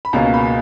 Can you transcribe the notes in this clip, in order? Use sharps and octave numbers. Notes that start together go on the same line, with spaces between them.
B5
C#2 B2 A#3 C#4 A#5
B5